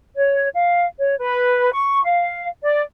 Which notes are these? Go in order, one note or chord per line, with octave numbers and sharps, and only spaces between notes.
C#5
F5
C#5
B4
C#6
F5
D5